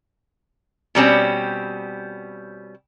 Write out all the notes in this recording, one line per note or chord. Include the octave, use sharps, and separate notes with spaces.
B2 G3 C4 C#4